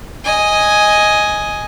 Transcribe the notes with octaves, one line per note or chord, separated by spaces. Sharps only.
D#5 G#5